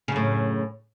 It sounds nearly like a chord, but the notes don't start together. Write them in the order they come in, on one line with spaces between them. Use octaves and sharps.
C#3 F#2 A2